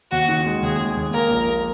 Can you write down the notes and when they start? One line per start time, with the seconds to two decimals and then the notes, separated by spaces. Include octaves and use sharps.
0.11 D#2 F#4
0.29 D#3
0.46 G#3
0.63 D#2 G#4
0.80 G#3
0.97 D#2
1.14 A#3 A#4
1.30 A#1
1.48 A#3